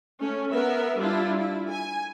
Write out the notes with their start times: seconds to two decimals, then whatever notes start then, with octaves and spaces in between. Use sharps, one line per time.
0.20 A3 C#4
0.50 B3 A#4 B4 E5
0.98 G3 D4 E4 F4
1.38 E4
1.69 G#5